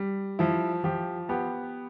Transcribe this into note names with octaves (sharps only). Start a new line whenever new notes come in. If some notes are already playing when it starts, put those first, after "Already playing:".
Already playing: G3
F3 E4
F3 G4
B3 G4